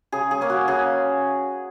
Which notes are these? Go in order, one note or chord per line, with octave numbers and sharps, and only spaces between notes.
C#3 G#4
G#4
A#3 C#4
F#4
C#3 G#4